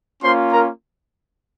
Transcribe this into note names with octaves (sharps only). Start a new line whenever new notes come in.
A#3 C#4 F4 C5 C6
A#4 A#5